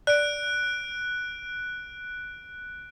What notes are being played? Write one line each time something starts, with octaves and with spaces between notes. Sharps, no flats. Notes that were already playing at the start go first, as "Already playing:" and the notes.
D5 F#6 D7